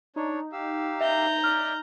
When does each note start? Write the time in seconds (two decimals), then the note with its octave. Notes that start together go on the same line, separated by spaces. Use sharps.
0.16 D4 D#4 C#5
0.52 G4 F5 E6
1.01 E5 A#5 G6
1.44 D5 E5 F6